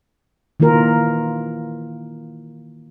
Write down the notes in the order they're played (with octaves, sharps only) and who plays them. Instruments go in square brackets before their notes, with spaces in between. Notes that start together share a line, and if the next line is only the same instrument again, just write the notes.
[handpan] D#3 E3 A#3 F4 A#4